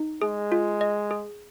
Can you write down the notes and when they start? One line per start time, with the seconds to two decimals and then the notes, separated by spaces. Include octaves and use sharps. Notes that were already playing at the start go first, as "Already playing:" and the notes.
Already playing: D#4
0.22 G#3 G#4
0.52 F4
0.81 D#5
1.11 G#4